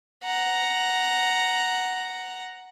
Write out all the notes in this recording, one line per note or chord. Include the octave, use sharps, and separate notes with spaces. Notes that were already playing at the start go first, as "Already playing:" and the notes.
F#5 A#5